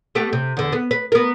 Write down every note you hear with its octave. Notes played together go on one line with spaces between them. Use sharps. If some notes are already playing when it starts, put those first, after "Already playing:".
A3 B3 G4
C3
E2 D3
B3
B4
B3 A#4